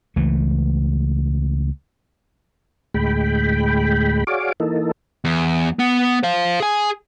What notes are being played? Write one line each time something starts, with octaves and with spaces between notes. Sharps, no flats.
C#2 E3 A3
D2 A2 G#3 G5 B5
F#4 G#4 C#5 D5 F5 D6
E3 A#3 D#4 A4
E2
B3
C5 F5
G#4 G#5